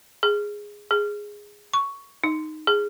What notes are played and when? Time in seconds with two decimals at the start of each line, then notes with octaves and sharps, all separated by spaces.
0.23 G#4
0.91 G#4
1.74 C#6
2.24 D#4
2.67 G#4